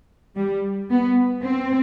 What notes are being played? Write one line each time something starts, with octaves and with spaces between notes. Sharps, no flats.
G3
B3
C4